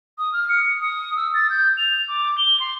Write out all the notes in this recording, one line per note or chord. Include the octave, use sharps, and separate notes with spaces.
D#6
F6
C#7
D#6
E6
A6
G6
F7
D6
G7
C6